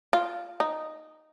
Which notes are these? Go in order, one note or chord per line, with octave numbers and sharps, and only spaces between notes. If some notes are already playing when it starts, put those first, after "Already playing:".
F4
D#4